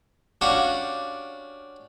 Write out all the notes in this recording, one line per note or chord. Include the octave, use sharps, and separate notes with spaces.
C#4 D4 F#4 G4 F5 F#5